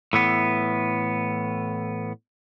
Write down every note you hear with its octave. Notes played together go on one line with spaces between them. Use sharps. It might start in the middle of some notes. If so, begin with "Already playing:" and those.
A2 E3 B3